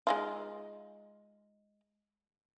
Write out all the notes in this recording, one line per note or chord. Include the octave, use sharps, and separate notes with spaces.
G#3 D#4 F4